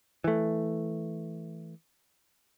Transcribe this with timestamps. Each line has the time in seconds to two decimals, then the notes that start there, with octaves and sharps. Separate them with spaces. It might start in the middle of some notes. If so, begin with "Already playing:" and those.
0.24 E3 A3